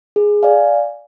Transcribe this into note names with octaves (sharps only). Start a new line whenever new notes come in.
G#4
D5 F5 G#5